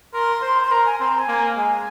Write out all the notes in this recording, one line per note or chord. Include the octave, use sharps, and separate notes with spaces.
A#4 C6
C5
C6
A#4 A#5
G#5
C4 C6
A#5
G#5
A#3
G#3 G#5